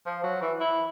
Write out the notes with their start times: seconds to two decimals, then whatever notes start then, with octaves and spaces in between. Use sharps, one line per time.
0.06 F3
0.23 F#3
0.41 E3
0.60 E4